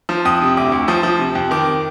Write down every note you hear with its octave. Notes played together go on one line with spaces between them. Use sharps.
F3
F2 D#6
C3
D2 D6
D2
F3 D#6
F3
C3
F2
D#3 D6